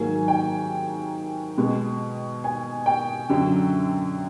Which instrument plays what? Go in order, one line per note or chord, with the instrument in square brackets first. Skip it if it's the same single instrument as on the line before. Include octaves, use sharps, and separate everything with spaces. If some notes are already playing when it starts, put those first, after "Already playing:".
Already playing: [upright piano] G#2 D#3 F#3 A#3 G#5
G5
B2 G#3
G#5
G5
F#2 D3 F#3